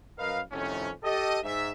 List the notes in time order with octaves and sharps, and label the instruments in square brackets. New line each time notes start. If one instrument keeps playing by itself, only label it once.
[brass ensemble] F#2 A#4 B4 D#5 F5
F2 A2 C3 D#3 A3 C#4
G4 A4 D#5
G#2 E5